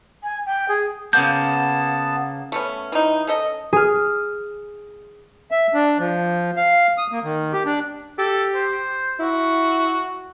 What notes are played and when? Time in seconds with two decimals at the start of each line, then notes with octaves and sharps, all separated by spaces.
0.23 G#5
0.46 G5
0.69 G#4
1.13 C#3 A#3 B3 A5 G6
2.52 A3 B3 C#4
2.92 E3 D#4
3.27 C#4 A4 D#5
3.73 G#4 F6
5.51 E5
5.74 D4
5.99 F3
6.57 F5
6.98 D#6
7.12 A#3
7.23 D#3
7.53 G4
7.65 D4
8.18 G4 A4
8.54 C5
9.20 E4 F#4